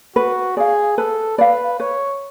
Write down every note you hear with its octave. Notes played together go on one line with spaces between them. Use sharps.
F#4 B4
G#4 D5 F5
A4 B4
B4 D5 F5
B4 C#5